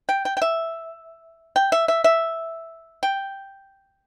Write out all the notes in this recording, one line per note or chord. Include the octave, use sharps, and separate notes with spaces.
G5
G5
G5
E5
G5
E5
E5
E5
G5